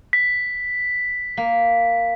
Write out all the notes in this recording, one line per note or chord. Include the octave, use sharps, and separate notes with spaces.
B6
A#3